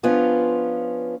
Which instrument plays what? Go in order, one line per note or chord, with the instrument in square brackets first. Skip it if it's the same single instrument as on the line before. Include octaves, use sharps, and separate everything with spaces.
[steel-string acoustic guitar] F3 B3 C#4 D4 F4